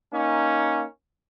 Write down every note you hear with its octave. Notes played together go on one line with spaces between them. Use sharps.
A#3 C#4 D#4